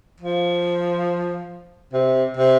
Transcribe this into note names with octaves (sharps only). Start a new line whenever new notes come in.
F3
C3
C3